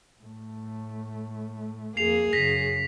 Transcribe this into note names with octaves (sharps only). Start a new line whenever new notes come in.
A2 A3
F2 A#3 G#4 C7 F7
F#2 C#3 A#6 B6